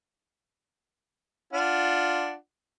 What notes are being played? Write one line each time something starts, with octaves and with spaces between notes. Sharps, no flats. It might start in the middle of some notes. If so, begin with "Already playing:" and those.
D4 F4 F#5